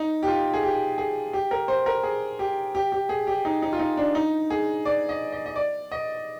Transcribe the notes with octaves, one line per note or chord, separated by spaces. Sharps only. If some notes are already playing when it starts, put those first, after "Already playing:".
Already playing: D#4
G4
F4
G#4
G4
G#4
G4
A#4
C5
A#4
G#4
G4
G4
G4
G#4
G4
D#4
D#4
F4
D#4
D4
D#4
G#4
D5
D#5
D#5
D#5
D5
D#5